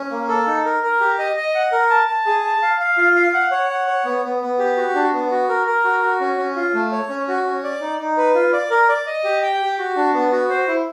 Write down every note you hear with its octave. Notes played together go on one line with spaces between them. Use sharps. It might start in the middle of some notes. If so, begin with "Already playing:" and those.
Already playing: C#4
A#3
A4
D#4
A#4
A#4
G4
D#5
D#5
F#5
A#4
A5
A5
G#4
A5
F5
F5
F4
F5
F#5
C#5
F#5
C#5
B3
B3
B3
G4
F#4
D4
B3
F#4
A#4
A#4
F#4
F#4
C#4
C#4
F4
A3
C#5
C#4
F#4
C#4
D5
D#4
D#4
B4
F4
D5
A#4
D5
D#5
G4
G5
G4
F#4
D4
B3
F#4
C5
E4